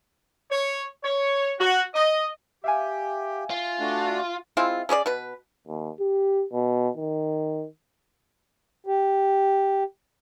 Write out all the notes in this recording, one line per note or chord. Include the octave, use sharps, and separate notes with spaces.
C#5
C#5
F#4
D#5
G4 E5 F5 G#5
F4
A3 D4 F#4
G#3 C4 E4 F4
C#4 G#4 C#5 D5
B2 B4
D#2
G4
B2
D#3
G4